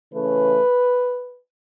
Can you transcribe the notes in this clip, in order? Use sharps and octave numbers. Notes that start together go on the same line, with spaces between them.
C#3 E3 A3 C#4 B4